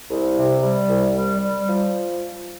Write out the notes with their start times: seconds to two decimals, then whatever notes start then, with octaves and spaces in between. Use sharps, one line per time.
0.10 C2
0.36 C3
0.62 G3
0.89 C2
1.15 G3
1.41 G3
1.67 F3